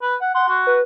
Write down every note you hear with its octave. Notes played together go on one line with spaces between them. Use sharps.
B4
F#5
F#5 C6
F#4
B4